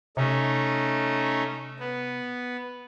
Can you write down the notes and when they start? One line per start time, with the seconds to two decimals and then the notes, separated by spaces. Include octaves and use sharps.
0.17 C3 A3 C#4 D#4
1.80 B3